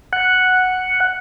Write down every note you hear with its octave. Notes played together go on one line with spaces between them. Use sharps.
F#5